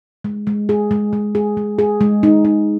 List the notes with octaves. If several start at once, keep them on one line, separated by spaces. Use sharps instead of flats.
G#3
G#3
G#4
G#3
G#3
G#4
G#3
G#4
G#3
D#4
D#4